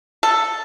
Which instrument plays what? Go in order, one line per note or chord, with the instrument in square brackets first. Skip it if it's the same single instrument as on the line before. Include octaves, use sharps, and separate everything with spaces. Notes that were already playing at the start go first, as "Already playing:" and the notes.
[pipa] A4